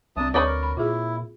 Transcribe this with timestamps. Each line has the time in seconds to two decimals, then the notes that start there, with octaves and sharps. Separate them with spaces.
0.16 C2 G3 C4 D4 A5 D#6
0.34 D2 D4 D#4 G#4 B4 C#5 D5
0.46 A#4
0.63 B5
0.77 A#2 E4 F4 G#4